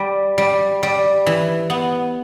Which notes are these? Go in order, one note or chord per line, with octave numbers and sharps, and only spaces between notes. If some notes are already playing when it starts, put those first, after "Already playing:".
Already playing: G3
G3
G3
E3
B3